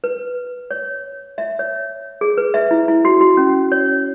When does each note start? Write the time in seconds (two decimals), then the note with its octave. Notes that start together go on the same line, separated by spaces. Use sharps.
0.04 B4
0.71 C#5
1.38 E5
1.59 C#5
2.21 G#4
2.38 B4
2.54 E5
2.71 E4
2.88 E4
3.05 F#4
3.21 F#4
3.37 C#4
3.72 C#5